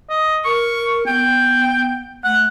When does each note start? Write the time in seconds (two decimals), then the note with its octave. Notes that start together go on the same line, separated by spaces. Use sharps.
0.10 D#5
0.45 A#4 C#6
1.07 B3 G5
2.24 A3 F#5